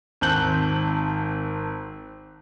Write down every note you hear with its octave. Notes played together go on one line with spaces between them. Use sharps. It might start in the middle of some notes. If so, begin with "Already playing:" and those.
G#1 C4 A5 F#6 G6 F#7